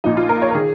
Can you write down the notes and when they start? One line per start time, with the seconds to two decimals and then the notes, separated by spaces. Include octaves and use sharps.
0.04 A#1 A#2 F3 D#4
0.17 F4
0.29 A#4
0.42 C#5
0.50 A#4
0.54 D#3 G#4